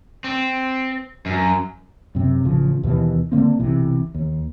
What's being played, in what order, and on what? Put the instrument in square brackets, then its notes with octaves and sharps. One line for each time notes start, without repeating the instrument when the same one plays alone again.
[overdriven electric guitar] C4
F#2
[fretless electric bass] F#2 C3
A1 C#3 F3
D#2 B2 E3
D3 A#3 C4
B1 C3 E3
D#2